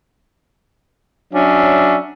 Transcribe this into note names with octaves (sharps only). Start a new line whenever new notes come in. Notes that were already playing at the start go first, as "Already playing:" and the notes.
F#3 C#4 D4 E5